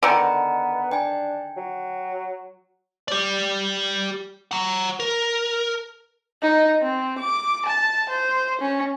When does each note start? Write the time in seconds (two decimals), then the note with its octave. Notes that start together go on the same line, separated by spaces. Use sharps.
0.03 D3 D#3 B3 B4 G#5 A#5
0.92 D4 G5 G#5
1.57 F#3
3.08 G4 D5
4.51 F#5 A#5
5.00 A#4
6.42 D#4
6.82 C4
7.18 D6
7.66 A5
8.09 C5
8.61 C#4